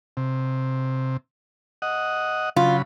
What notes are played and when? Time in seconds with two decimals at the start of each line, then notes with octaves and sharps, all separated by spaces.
0.17 C3
1.82 D#5 F#5
2.56 C#3 F#3 F4 B5